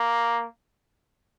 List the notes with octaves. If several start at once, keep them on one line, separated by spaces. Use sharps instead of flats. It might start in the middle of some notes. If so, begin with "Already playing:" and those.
Already playing: A#3